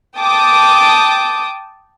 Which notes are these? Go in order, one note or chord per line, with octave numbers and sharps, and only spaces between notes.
G5 A5 D6 D#6